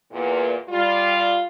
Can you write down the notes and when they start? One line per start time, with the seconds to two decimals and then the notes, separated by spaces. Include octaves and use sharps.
0.11 E2 A#2
0.68 G3 F4